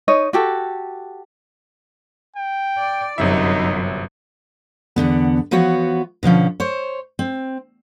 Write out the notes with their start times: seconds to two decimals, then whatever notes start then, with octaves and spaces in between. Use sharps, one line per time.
0.08 D#4 C#5 D#5
0.33 F#4 G4 A4
2.36 G5
2.78 D5
3.18 G1 F#2 C3 D#4 E5
4.96 E2 G#2 D3 B3
5.51 E3 F3 B3 F#4 C#5
6.23 B2 D3 F3 C#4
6.60 C5 C#5
7.19 C4